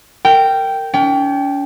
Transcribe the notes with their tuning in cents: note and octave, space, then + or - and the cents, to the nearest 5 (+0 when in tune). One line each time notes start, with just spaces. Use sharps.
A#4 -25 G5 -5
C#4 +45 G5 +0